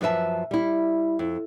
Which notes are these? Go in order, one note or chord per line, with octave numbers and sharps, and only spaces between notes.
F#2 F3 B4 E5 A5
G3 E4
F2